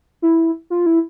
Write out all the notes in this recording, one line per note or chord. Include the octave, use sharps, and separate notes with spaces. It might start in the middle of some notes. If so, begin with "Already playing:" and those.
E4
F4
E4